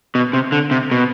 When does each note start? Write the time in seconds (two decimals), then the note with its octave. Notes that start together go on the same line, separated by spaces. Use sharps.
0.15 B2
0.33 C3
0.52 D3
0.71 C3
0.91 B2